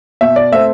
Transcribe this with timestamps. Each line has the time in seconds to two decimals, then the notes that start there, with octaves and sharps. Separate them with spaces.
0.21 B2 E5
0.36 D5
0.52 A3 C4 E5